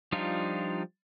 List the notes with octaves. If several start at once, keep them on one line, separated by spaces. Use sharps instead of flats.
F3 G3 D4 D#4 F4